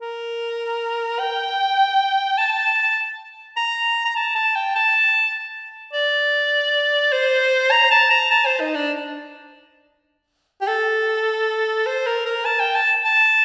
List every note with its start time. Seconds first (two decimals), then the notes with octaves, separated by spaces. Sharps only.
0.01 A#4
1.19 G5
2.38 A5
3.56 A#5
4.05 A#5
4.16 A5
4.35 A5
4.56 G5
4.75 A5
5.93 D5
7.13 C5
7.71 A#5
7.91 A5
8.11 A#5
8.31 A5
8.46 C5
8.60 D#4
8.75 D4
10.61 G4
10.68 A4
11.86 C5
12.07 A#4
12.26 A#4
12.46 A5
12.60 G5
12.75 A5
13.05 A5